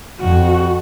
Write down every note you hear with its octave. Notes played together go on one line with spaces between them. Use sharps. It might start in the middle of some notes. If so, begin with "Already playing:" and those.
F2 F#4